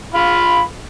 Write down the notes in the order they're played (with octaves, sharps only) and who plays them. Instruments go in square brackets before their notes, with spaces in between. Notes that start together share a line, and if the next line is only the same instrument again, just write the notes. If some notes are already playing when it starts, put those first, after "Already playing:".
[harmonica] F4 F5 B5